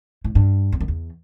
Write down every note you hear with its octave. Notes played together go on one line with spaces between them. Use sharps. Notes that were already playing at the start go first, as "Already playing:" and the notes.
A2
G2
E2
F#2
E2